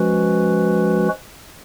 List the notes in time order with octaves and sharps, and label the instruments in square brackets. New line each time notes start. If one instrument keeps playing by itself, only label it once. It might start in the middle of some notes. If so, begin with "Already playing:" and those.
Already playing: [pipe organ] F3 G#3 C#4 F#4 B4